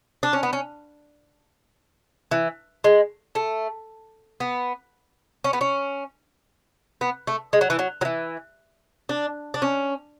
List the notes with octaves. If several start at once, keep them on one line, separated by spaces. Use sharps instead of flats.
D4
C#4
B3
C#4
E3
G#3
A3
B3
C#4
B3
C#4
B3
A3
G#3
F#3
E3
F#3
F#3
E3
D4
D4
C#4